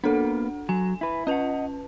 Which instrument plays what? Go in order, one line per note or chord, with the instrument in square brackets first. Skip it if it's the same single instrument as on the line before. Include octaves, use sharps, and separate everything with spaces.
[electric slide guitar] A#3 B3 [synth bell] D4 A4 F#5
[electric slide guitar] F#3 [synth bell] G#5
[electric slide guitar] E4 B4
[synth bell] C#4 B4 A5 [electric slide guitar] D#5 F#5